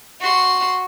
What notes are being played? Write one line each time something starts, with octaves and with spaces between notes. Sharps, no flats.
F#4 C6